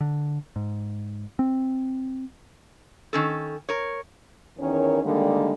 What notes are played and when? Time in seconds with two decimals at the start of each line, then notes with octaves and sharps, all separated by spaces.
0.01 D3
0.56 G#2
1.39 C4
3.13 D#3 C#4 A4
3.69 A#4 C#5
4.58 E2 D#3 C#4 A#4 C#5
5.03 D3 D#3 G3 G#3 A#3